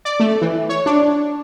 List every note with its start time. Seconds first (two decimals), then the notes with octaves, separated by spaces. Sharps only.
0.05 D5
0.20 A3
0.41 E3
0.69 C#5
0.86 D4